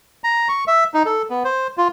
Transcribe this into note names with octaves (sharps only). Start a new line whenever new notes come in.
A#5
C#6
E5
D#4
A4
B3
C5
F4